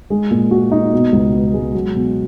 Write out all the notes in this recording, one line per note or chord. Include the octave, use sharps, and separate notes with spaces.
G#3
A#2
F#4
D#4
B2
C#2
B3
G#3
F#3
B2